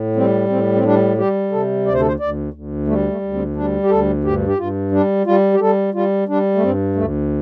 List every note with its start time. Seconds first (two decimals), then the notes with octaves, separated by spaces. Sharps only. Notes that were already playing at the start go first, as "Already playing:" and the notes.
Already playing: A2
0.16 G3 C4
0.49 A2 C4
0.76 C4
0.83 G3 D4
1.17 G3 G4
1.52 C3 A4
1.86 D2 D5
1.94 C5
2.00 A4
2.08 C5
2.20 D2 D5
2.54 D2
2.87 G3 A3
3.10 A3
3.22 D2
3.34 C4
3.56 G3 D4
3.83 G4
3.90 D2 A4
4.24 G2 G4
4.47 G4
4.58 G2 F4
4.92 G3 D4
5.26 G3 F4
5.54 G4
5.60 G3 A4
5.94 G3 F4
6.28 G3 D4
6.55 A3
6.62 G2 C4
6.96 D2 A3